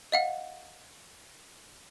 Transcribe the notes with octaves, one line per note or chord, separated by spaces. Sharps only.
D#5 F5 F#5